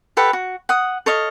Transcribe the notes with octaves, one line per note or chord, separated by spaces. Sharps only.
G4 A4 B4 F#5
F#4
F#5 D#6
A4 C#5 D#5 F5